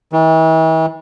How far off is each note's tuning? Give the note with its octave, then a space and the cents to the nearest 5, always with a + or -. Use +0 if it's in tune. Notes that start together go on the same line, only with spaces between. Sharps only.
E3 -40